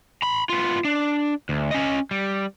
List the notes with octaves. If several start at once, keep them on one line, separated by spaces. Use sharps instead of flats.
A#5 B5
B3 F4
D4
D2
C#4 D#5
G3